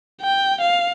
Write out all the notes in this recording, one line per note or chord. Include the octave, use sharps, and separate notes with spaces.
G5
F5